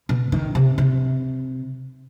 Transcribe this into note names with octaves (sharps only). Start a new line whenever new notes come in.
B2
D#3
C3
C3